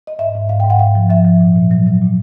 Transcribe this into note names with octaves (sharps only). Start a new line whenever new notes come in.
D#5
G#2 E5
G#2
G#2 F5
G#2 G5
F#5
G#2 F5
F3
F3 E5
F3
A#2
A#2
F#3
F#3
A#2